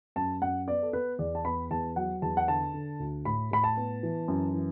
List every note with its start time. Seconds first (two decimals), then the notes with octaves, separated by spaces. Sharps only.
0.16 F#2 A5
0.42 F#2 F#5
0.67 B3 D5
0.83 A4
0.93 B3 B4
1.19 E2 D5
1.35 A5
1.45 B3 B5
1.70 E2 A5
1.96 F#3 F#5
2.22 E2 A5
2.37 F#5
2.48 D3 A5
2.73 D3
3.00 D2
3.25 A2 B5
3.51 A2 B5
3.64 A5
3.77 B3
4.03 E3
4.28 F#2
4.54 E3